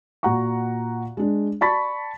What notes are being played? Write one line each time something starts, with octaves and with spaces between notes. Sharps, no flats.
A#2 F#4 F#5 A#5 C#6
G#3 D4
D5 A5 B5 C#6 A6 B6